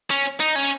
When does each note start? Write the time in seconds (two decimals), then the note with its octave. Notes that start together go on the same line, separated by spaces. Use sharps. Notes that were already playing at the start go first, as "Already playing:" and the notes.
0.11 C#4
0.40 D#4
0.55 C#4